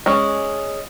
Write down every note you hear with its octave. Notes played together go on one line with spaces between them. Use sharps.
G#3 C#4